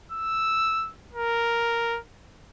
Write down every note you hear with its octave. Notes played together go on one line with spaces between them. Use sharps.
E6
A#4